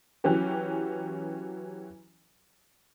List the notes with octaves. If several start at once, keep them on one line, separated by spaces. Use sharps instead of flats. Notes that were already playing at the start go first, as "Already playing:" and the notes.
E3 F#3 C#4 G4